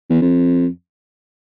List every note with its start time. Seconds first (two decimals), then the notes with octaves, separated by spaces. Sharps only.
0.10 E2
0.22 F2